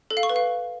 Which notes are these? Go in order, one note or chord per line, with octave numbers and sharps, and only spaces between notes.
A4
F5
C#6
B4
F5